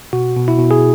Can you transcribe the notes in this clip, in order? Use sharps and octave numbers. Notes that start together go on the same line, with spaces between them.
B2 F#4
B2
E4
B2
G#4